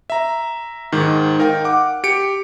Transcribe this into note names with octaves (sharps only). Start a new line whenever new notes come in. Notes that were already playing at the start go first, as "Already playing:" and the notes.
E5 A#5
G#2 D#3
D#4 A#4 F5 G5
F#5 D6
G4 C#7 D7